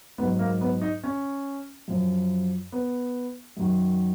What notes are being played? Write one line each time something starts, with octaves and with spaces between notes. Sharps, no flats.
G#2 F#3 B3
A#3
B3
D#4
C#4
F#2 F3
B3
F#2 D#3 F#3